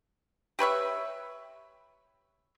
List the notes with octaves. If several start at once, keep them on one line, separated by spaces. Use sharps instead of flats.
G4 B4 C#5 E5